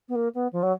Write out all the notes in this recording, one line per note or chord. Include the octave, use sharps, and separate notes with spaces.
B3
A#3
B3
F3
F#3